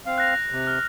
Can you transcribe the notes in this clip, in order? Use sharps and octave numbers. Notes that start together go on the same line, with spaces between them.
C4 F5
F#6 A#6 F7
C3
F6